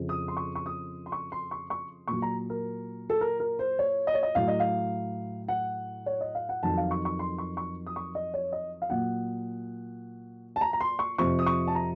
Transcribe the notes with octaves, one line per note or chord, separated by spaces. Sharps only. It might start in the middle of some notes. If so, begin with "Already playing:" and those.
Already playing: F2 C#3 F3
D#6
C6
C#6
C#6
D#6
C6
C#6
C6
C#6
C#6
A#2 F#3 C#6
A#5
A#4
A4
A#4
A#4
C5
C#5
D#5
C#5
D#5
A2 F#3 F5
D#5
F5
F#5
C#5
D#5
F5
F#5
F2 D#3 F#3 A5
F5
C#6
C#6
C6
C#6
C#6
D#6
C#6
D#5
C#5
D#5
F5
A#2 F#3 F#5
A5
A#5
A#5
C6
C#6
F2 C3 F3 C#6
D#6
C#6
A5
A#5